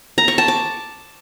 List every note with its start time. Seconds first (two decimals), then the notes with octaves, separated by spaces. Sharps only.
0.18 A#5
0.28 C#6
0.38 A5
0.48 D6